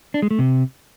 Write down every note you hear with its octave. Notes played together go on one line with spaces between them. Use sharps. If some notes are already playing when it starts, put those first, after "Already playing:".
D4
G#3
A3
C3